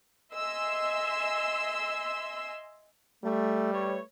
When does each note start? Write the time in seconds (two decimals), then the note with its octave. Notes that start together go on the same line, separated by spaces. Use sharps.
0.34 D#5 E5 G#5 C6 E6
3.24 G3 A3
3.74 A3 B4 C#5